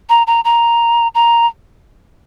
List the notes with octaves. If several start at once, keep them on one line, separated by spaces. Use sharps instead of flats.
A#5
A#5
A#5
A#5